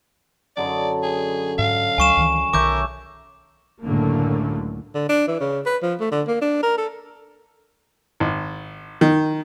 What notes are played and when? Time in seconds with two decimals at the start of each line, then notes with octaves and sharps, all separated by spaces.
0.57 F#2 D3 D#4 D5
1.03 G#4
1.59 G#2 F5
1.98 C#2 F#3 G#5 C#6 E7
2.17 C#2 D#3 E3
2.54 B1 D#3 A#4 C#5 E5 A5 D6 G6
3.83 C#2 F#2 A2 D3 A3 A#3
4.94 D3
5.09 D4
5.27 E3
5.40 C#3
5.66 B4
5.82 F3
6.00 A3
6.11 D3
6.27 A#3
6.41 D4
6.62 A#4
6.77 A4
8.20 G#1
9.01 D#3